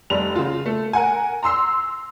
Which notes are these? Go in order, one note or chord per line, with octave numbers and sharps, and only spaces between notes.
F1 G3 F7
C#3 F4
A3
A#4 F#5 G#5
A#5 C6 E6 C7